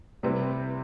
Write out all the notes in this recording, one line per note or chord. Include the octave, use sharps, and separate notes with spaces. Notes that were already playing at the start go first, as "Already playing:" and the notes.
C3 G3 C4 E4 B4